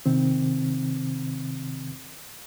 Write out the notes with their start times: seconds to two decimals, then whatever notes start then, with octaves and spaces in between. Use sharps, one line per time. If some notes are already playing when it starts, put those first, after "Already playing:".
0.06 C3 D#3 C4